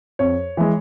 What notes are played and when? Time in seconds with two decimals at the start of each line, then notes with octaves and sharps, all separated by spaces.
0.19 F2 C#5
0.57 E3 G#3